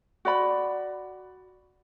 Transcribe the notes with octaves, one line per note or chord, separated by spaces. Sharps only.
F#4 D5 B5